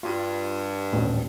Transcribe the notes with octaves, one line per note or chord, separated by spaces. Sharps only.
G2 F4
D#1 A1